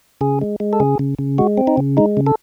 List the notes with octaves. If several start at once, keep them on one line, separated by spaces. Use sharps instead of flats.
C#3 G#4
G#3
G#3
A4
C#3 G#4
C#3
C#3
G#3 F#4
C4
D#4
C#3
G#3 D#4
C#3
A4